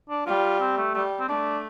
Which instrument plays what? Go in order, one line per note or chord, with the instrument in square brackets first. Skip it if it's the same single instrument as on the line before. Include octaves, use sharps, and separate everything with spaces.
[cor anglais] D4
[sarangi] G3 [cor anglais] F4
[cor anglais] C4
A3
[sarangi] G3 [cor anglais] A3
[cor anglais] C4
[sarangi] A3 [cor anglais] D4